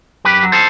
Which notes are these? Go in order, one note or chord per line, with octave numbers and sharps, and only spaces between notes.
F#2 G4 B4
F#3
A4 C5